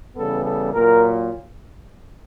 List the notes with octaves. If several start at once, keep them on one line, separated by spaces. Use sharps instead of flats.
C#3 E3 G3 B3 A4
A4
A#2 F#3 A#3 A#4